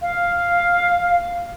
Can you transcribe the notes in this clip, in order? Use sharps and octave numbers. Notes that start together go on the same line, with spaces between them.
F5